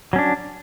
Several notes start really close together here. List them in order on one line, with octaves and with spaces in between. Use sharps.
F#3 C#4 D4